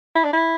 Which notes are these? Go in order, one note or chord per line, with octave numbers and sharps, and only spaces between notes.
E4
D4
E4